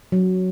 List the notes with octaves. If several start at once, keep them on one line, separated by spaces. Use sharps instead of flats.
F#3